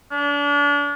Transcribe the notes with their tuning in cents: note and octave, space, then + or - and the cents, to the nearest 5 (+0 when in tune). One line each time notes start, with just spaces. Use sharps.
D4 -35